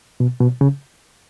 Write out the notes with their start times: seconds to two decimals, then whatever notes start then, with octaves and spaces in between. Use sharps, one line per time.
0.20 B2
0.41 B2
0.61 C#3